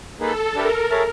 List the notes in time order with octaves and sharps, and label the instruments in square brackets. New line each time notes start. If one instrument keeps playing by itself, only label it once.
[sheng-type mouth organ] A#3 D#4 G#4 B4 [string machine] A4
[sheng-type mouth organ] D4 G4 B4 E5 [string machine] A#4
[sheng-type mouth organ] G#4 C#5 E5 A5